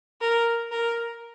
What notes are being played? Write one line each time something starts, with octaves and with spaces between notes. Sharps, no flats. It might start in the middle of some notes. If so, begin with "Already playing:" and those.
A#4
A#4